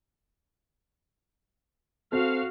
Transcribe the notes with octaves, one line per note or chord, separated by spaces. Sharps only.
C4 F#4 A4 F5